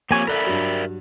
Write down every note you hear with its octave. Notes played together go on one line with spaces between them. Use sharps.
F3 A#3 C4 G4 C#5 G#5 C#6
A4 A#4 D5 E5 B5 F#6
G2 F#3